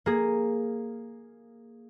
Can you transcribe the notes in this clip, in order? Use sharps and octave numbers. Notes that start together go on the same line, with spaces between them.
A#3 G#4